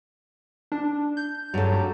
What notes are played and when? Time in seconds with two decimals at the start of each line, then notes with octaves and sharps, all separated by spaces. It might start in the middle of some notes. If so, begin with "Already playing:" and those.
0.72 D4
1.17 G6
1.54 G2 F#3 A4